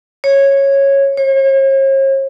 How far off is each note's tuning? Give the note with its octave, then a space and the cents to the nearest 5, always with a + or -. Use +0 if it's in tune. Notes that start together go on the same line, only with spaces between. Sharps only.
C#5 -10
C#5 -45